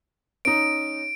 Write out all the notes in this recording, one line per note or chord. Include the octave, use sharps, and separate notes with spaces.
C#4 D#4 D7